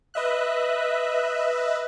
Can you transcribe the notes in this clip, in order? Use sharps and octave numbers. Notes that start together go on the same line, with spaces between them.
B4 D#5 E5 F#6